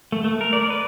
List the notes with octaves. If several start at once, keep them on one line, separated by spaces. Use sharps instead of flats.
A3
A3
A#4
D5
B4